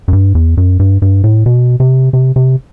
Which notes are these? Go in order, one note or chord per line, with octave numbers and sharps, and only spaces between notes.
F#2
G2
E2
F#2
G2
G2
A2
B2
C3
C3
C3